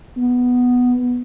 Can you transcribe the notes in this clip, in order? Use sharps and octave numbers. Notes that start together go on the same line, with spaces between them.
B3